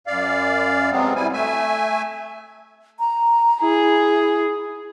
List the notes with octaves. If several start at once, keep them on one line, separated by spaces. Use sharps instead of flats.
F#2 D5 F5
F2 C3 F#3 G#3 B3 C4
G3 E4 G#5
A3 E5 G#5
A#5
E4 G#4